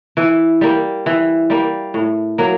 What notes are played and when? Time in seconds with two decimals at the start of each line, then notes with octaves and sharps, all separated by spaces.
0.17 E3
0.61 G3 A#3
1.06 E3
1.50 G3 A#3
1.94 A2
2.38 F#3 A#3